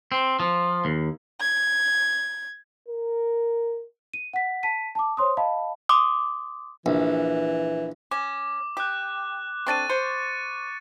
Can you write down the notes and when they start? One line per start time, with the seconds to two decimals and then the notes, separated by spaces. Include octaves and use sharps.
0.12 C4
0.40 F3
0.85 D#2
1.40 G#6
2.88 A#4
4.13 D#7
4.33 F#5 B6
4.63 A5 B6 D#7
4.95 A5 D6
5.17 C5 C#5 C6 D#6
5.37 D#5 F5 A5 B5
5.89 C6 D6 D#6
6.86 A#1 E3
8.11 C#4 D6
8.77 G4 D6 F#6
9.67 C4 D4 A4 C#6 A6 D#7
9.90 C5 C#7